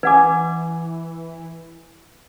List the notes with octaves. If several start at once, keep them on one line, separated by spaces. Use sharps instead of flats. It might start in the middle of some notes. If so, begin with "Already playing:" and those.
E3 B4 F#5 G#5 D6 G#6